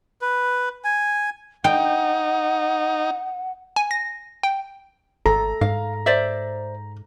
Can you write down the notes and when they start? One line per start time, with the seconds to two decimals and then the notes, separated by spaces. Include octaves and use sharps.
0.21 B4
0.84 G#5
1.64 D#4 F#5 G5
3.76 G#5
3.91 A#6
4.43 G5
5.26 G#1 A4 A#5
5.61 G#2 F5
6.06 C5 D5 E5